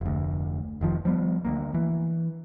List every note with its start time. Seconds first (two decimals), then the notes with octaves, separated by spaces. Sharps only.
0.01 F1 D2
0.81 F1 D#3 F3
1.05 F3 G3 B3
1.45 D2 A#3
1.74 E3